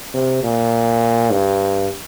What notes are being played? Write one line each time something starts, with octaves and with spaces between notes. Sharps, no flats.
C3
A#2
G2